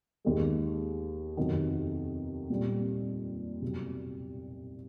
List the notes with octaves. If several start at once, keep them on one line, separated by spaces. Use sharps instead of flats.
D#2 D#3 G#3
F2 C3 D#3 F#3 B3
A#2 G3 C4
C2 B2 F#3